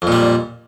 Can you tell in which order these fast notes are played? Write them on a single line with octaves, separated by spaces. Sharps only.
F2 A#2 G3